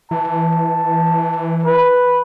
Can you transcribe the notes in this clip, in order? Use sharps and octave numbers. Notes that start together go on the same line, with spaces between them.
E3 A5
B4